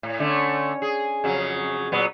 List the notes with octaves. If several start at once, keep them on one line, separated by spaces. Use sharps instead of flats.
A2
D3 A3 C#4
G#4
F2 C#3 F#3
A#2 F#3 B3